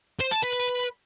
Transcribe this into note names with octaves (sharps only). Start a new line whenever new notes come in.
C5
A5
B4